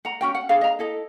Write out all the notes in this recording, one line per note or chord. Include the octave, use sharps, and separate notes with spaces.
F#5 A#5
C#4 F#4 G5
F#5
D4 G#4 F5
D#5 A#5
E4 A4 D#5